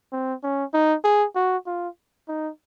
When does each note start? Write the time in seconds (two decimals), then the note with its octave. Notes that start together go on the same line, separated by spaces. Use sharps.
0.13 C4
0.43 C#4
0.74 D#4
1.04 G#4
1.36 F#4
1.67 F4
2.28 D#4